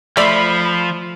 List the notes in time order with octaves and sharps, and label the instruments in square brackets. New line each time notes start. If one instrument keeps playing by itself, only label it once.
[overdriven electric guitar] F3 [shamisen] A3 D5 [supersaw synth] B5